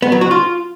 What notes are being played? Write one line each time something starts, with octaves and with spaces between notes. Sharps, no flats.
B3
F#3
F#4
F4